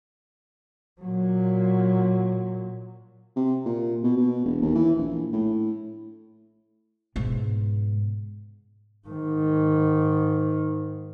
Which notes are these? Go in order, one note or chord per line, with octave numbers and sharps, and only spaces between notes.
A#2 F#3
C3
A#2
B2
B2
E1
D#2
E3
A#1
A2
G#2 B2
G#2 D#3